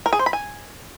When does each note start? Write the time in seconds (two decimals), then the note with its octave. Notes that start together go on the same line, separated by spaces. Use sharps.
0.06 A#4
0.13 G#4
0.19 C5
0.26 B5
0.33 G#5